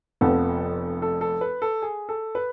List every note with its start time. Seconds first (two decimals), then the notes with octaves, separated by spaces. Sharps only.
0.21 F1 F2 F3 B3 A4
1.02 A4
1.21 A4
1.41 B4
1.62 A4
1.82 G#4
2.09 A4
2.35 B4